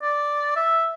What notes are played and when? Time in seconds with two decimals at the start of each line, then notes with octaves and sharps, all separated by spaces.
0.02 D5
0.56 E5